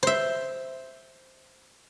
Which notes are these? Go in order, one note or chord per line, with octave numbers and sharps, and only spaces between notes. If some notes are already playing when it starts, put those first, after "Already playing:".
C5 E5